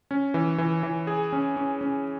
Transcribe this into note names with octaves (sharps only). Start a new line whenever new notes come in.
C#4
E3
E3
E3
G#4
C#4
C#4
C#4